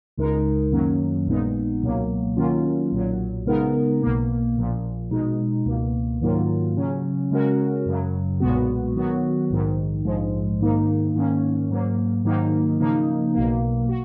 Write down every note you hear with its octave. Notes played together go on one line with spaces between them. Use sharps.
C#2 C#3 G#3 D#4 A#4
F#2 D#3 F#3 A#3 C#4
A#1 A#2 G#3 B3 D#4
C#2 B2 F#3 A#3
D#3 F#3 A#3 C#4 F4
B1 A#2 F#3
C#3 G#3 B3 D#4 A#4
B1 B2 A#3
A#1 A#2 F3
B2 G#3 D#4
C#2 B2 A#3
G#2 D#3 F#3 A#3 F4
C#3 F#3 C#4
C#3 G#3 C#4 F#4 A#4
F#2 C#3 F#3
B1 A#2 G#3 B3 F#4
D#3 F#3 B3 F#4
A#1 G#2 D#3
A#1 G#2 F3 G#3
G#2 D#3 A#3 D#4
G#2 D#3 A#3 C#4
G#2 F#3 A#3
G#2 D#3 F#3 A#3 D#4
C#3 F3 A#3 D#4
B1 B2 A#3
F#4